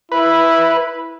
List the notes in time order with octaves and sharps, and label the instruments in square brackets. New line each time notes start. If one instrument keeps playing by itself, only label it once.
[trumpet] E4 [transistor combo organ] B4